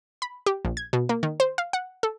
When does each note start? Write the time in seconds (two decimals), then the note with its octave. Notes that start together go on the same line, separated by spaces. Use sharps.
0.22 B5
0.46 G4
0.65 A#1
0.77 G#6
0.93 B2
1.09 A#3
1.23 D#3
1.40 C5
1.58 F5
1.73 F#5
2.03 A4